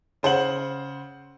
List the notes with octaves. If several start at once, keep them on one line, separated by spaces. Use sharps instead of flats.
C#3 C5 F#5 F#7